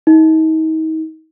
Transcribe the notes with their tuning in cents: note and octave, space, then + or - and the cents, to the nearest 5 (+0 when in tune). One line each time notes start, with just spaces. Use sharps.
D#4 +35